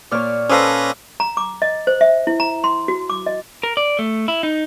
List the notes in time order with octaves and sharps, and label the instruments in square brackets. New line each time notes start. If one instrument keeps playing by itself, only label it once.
[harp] A#2 F6 [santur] C#5 D5
[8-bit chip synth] C#4 B4 A#6 [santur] A4 C5 [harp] F5 D6 D#6
[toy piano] A#5
D6
D#5
C5
E5
E4
A#5
C6
F#4
D6
D#5
[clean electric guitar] A#4
D5
A3
E4
D#4